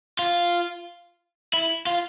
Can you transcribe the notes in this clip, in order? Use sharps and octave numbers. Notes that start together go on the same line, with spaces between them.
F4
E4
F4